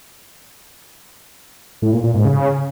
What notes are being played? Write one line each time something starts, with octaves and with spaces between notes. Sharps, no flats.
A2
A#2
A#2
G#2
C#3